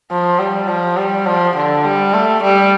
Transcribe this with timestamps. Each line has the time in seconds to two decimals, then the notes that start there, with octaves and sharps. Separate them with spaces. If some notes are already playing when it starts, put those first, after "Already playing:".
0.11 F3
0.39 G3
0.68 F3
0.97 G3
1.27 F3
1.55 D3
1.85 G3
2.14 A3
2.43 G3